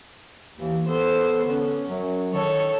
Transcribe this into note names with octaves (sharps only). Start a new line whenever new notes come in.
D#2 E3
B3 A4 C5
D3 C#4
F#2 F#3
D#3 A4 C#5